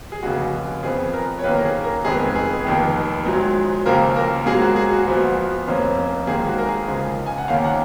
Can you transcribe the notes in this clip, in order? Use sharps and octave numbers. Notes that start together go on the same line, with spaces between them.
G#4
F1 D#2 C#3 F#4
F2 F3 B3 G#4
A#4
C#5
F#2 D#3 A#3 C#4 B4
A#4
G#4
A#4
F1 F2 D#3 G#3 B3 G#4
G#4
F1 D#2 D#3
A#1 G#2 F#3
D#2 C#3 F3 A#3 A#4
A#4
G#2 F#3 A#3 G#4
F#4
G#4
F#4
A#1 A#2 F3 B3 F#4
F1 F2 F3 A#3 C#4
G#1 G#2 D#3 A#3 G#4
F#4
A#4
G#4
C#2 C#3 F3
G#5
F#5
D#2 D#3 A#3 C#4 F5
F#5